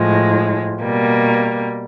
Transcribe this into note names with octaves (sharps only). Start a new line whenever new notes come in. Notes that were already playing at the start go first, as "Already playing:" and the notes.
Already playing: A2 F3 G#3
B2 G3 A#3